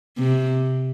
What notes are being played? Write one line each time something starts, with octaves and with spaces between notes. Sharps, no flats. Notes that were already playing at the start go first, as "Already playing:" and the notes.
C3